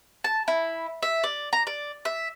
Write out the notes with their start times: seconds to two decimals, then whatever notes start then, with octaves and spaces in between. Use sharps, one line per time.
0.24 A5
0.48 E4
1.03 E5
1.23 D5
1.53 A#5
1.67 D5
2.05 E5